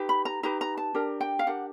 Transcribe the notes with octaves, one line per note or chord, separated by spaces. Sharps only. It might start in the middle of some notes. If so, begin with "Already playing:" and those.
Already playing: D#4 G4 B4
B5
A#5
D#4 G4 B4 A#5
A#5
A5
D4 G4 A#4
G5
F5
D4 G4 A#4 F#5